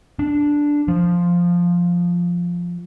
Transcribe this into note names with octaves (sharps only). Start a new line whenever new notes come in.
D4
F3